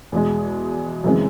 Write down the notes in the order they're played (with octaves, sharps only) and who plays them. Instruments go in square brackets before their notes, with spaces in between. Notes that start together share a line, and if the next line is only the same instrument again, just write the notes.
[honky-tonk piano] E2 B2 G#3
F#2 C#3 E3 G#3 C4